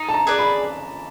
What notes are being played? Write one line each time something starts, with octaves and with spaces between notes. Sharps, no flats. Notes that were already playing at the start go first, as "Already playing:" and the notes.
Already playing: D#4
A5
A#5
G#4 B4 D5
B5